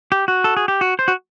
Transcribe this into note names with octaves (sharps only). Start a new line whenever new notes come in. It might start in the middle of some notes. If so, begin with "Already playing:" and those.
G4
F#4
A4
G#4
G4
F#4
C5
F#4